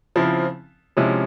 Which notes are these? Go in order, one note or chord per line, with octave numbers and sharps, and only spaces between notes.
C#3 F3 C4 E4
C3 F3 G#3 C#4 E4